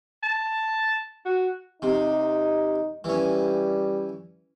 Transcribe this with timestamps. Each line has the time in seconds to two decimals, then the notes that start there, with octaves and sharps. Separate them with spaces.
0.23 A5
1.25 F#4
1.82 C3 D#4
3.04 E3 G3 C#4